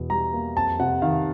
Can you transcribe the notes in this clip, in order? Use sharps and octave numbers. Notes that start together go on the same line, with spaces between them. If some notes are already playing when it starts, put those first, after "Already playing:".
Already playing: E2 B2
G3 A#5
A#3
F2 A5
C3 F#5
D#3 F5